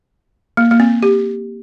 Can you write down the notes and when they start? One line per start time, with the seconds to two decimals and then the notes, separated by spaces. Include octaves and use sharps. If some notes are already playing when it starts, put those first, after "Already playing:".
0.57 A#3
0.71 A#3
0.80 C4
1.03 G4